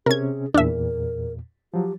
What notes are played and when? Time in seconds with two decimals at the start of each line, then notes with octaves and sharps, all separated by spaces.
0.06 C3 C#4 G#4 A#4 G#6
0.54 E2 A#2 D4 A#4 E5
1.74 F3 F#3 G4